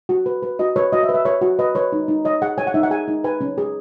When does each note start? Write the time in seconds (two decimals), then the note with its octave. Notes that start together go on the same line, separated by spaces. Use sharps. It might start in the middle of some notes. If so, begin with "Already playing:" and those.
0.09 F#4
0.26 B4
0.43 B4
0.59 F#4 D#5
0.76 B4 C#5
0.93 F#4 D#5
1.03 E5
1.09 B4
1.14 E5
1.25 B4 C#5
1.42 F#4
1.59 B4 D#5
1.75 B4 C#5
1.93 D#4
2.08 D#4
2.25 C#5 D#5
2.42 G#4 F#5
2.58 C#5 G#5
2.67 F#5
2.74 D#4 E5
2.83 F#5
2.91 G#4 G#5
3.08 D#4
3.24 B4 G#5
3.41 C#4
3.58 G#4